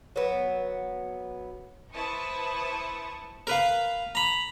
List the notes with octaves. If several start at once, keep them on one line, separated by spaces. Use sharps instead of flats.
F#3 B3
E4 B4 C5 A5 C#6 D#6
A#4 B4 F5
A#5 B5